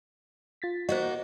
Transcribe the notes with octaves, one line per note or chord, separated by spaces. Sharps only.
F4 A6 B6
A#3 D#4 F#4 C5 D#5